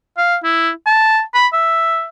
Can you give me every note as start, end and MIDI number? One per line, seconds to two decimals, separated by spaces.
0.18 0.36 77
0.44 0.70 64
0.86 1.21 81
1.34 1.47 83
1.53 2.06 76